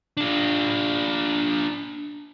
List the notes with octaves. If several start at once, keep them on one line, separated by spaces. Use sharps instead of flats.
D4 F4